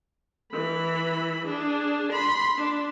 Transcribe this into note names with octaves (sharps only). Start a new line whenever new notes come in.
E3 B5
D4 G#4
B5 C6
D4